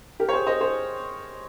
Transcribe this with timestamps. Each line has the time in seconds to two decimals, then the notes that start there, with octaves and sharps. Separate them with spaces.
0.20 G4 A#4
0.29 C#5
0.33 G#4 C5
0.47 C5 D#5
0.61 G#4 C5